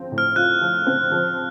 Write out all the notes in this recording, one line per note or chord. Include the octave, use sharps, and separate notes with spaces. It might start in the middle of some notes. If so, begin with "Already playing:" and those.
Already playing: F3 C4
A2
F6
F4 F#6
F3
C4
F3